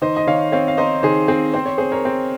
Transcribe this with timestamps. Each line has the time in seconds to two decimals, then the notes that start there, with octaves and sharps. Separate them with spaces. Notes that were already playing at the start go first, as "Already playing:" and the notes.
0.02 D#3 C5 D#5
0.17 D#5
0.27 D#3 C#5 F5
0.52 C4 C#5 F5
0.68 F5
0.77 D#4 C5 D#5
1.03 D#3 G#4 C5
1.28 C4 G#4
1.54 C4 C5
1.66 C#5
1.78 C4 G#4 C5
1.92 A#4 C#5
2.05 C4